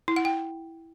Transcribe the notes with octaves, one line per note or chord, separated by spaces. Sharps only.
E4
F#5
G5